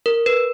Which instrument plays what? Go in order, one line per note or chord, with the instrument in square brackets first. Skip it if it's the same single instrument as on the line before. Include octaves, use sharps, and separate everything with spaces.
[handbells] A#4
B4